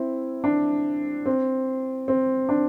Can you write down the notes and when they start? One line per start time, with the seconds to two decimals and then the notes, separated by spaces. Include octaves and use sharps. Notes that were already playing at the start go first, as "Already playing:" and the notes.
Already playing: C4 E4
0.44 D4
1.26 C4
2.08 C4
2.49 D4